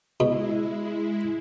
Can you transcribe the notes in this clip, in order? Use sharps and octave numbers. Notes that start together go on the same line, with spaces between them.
B2 G#3 E4